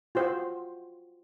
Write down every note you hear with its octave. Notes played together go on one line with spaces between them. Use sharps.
F4 F#4 C5